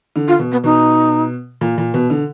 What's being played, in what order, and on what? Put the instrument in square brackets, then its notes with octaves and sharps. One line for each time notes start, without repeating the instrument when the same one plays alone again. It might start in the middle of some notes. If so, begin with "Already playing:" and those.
[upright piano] D3
[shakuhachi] F4
[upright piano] B2
[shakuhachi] B3
[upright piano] B2 [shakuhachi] D#4
[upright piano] A#2
A#2
B2
D3